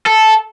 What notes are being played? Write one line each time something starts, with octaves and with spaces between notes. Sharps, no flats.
A4